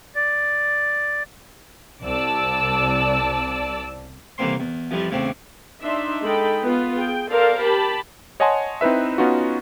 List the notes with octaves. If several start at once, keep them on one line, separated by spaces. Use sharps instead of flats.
D5
C2 D5 A5 E6
C2 D3 E3 A#3 C4 C6
E2
F2 E3 F3 G3
E2 A2 C#3 C4 D4
D4 D#4 E5 C6
G#3 D#4 A4 G5 B5
B3 F4 B4
G#4 G5
A4 A#4 C5 D5 F5
G4 A5 B5
C#5 D#5 F#5 G#5 A5 C6
C4 D#4 E4 B4 E5
B3 C#4 D#4 F4 F#4